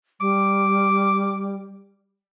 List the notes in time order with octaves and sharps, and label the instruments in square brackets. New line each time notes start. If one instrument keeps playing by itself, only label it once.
[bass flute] G3 [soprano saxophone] D6